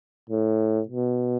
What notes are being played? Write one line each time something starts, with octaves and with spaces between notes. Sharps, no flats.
A2
B2